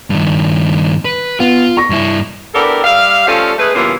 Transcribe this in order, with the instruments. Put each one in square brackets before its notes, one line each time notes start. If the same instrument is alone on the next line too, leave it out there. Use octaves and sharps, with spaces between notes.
[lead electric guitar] G2 D#3
B4
[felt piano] B3 [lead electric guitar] F4
[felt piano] C#6 A#6
[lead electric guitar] G2 E4
[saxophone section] B3 D4 E4 G4 A4 A#4
G3 D5 E5 F5
F3 G3 A3 C#4 A4 F5
G#3 A3 G#4 B4
G2 C#3 E3 A#3 B3 F4